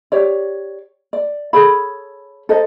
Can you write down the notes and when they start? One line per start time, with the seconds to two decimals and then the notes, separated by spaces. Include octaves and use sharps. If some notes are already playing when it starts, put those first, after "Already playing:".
0.12 G4 C#5 D5
1.13 D5
1.53 G#4 A4 C#5 B5
2.49 A4 A#4 C5 D#5